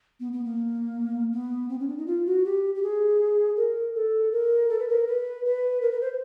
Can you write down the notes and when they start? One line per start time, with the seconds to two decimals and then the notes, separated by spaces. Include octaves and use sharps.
0.20 B3
0.33 B3
0.45 A#3
1.33 B3
1.69 C4
1.80 C#4
1.88 D4
1.98 D#4
2.07 F4
2.26 F#4
2.45 G4
2.75 G4
2.83 G#4
3.57 A#4
3.95 A4
4.32 A#4
4.69 A4
4.79 B4
4.88 A#4
5.07 B4
5.45 B4
5.82 A#4
5.92 B4
6.01 C5